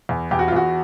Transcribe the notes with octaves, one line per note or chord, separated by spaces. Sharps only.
E2
E2 G4
F#4
F4
E2 F#4